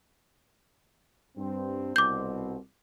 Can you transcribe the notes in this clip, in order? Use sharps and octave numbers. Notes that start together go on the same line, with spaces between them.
G2 C4
C2 B2 C4 D6 G6